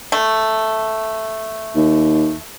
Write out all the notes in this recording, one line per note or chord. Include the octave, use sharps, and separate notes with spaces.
A3
D#2